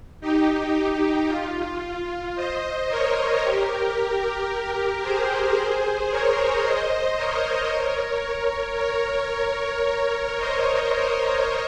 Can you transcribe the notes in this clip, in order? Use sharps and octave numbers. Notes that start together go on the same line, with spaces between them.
D#4 G4
D#4
F4
C5 D#5
A#4 C#5
G4 A#4
G#4 C5
A#4 C#5
C5 D#5
A#4 C#5
A#4 C#5
C5 D#5